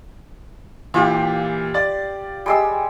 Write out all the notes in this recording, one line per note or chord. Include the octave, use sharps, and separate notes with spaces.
A#2 E3 F4 G4
D5 A6
G3 G#3 E6